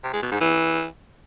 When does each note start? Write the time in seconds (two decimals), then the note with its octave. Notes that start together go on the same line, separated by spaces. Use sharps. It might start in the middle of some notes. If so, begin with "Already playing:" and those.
0.04 C3
0.13 G#3
0.22 B2
0.31 G#2
0.41 E3